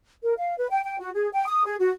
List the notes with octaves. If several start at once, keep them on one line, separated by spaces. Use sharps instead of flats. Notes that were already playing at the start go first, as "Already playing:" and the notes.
A#4
F5
B4
G5
G5
F#4
G#4
G5
D#6
G#4
F#4